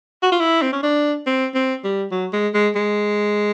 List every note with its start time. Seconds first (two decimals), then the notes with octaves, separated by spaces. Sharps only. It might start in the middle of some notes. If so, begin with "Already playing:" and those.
0.23 F#4
0.32 F4
0.40 E4
0.62 C4
0.73 C#4
0.83 D4
1.26 C4
1.55 C4
1.84 G3
2.11 F#3
2.33 G#3
2.54 G#3
2.76 G#3